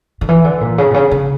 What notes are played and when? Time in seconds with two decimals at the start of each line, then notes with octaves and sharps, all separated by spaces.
0.21 D3
0.29 E3
0.44 D3
0.61 A#2
0.78 C#3
0.91 A#2
0.94 C#3
1.11 C#3